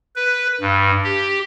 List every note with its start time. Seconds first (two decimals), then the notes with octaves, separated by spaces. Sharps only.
0.16 B4
0.61 G2
1.04 G4